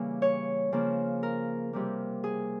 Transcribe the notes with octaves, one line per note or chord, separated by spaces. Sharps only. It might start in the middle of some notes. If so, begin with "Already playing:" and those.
Already playing: C#3 E3 G3 A#3
C#5
C#3 F3 A#3
A#4
C3 G3 A#3
G#4